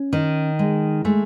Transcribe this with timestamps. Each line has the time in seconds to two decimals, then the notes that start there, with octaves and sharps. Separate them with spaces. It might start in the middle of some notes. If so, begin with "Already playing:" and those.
Already playing: C#4
0.13 D#3
0.59 G#3
1.05 G#3 A3